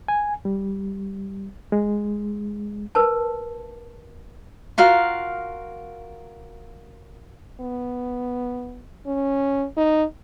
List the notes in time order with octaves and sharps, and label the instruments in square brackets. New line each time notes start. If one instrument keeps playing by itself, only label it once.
[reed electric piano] G#5
G3
G#3
[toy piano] A#4 B4 A5
[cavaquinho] F4 F#4 A#4 F5
[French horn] B3
C#4
D#4